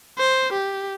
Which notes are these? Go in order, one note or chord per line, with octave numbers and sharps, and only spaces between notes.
C5
G4